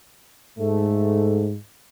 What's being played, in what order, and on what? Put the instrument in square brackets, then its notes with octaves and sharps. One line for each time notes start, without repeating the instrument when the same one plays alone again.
[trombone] G#2 [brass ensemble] A3